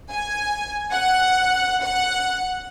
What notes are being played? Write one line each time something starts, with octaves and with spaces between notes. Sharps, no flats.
G#5
F#5
F#5